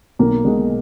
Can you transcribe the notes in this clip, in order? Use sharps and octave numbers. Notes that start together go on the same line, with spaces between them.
B1 A#3
B2 G#3